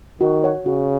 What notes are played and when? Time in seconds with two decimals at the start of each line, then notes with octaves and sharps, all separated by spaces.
0.21 D#3 F#4
0.44 C#5 F#5
0.66 C#3 F#4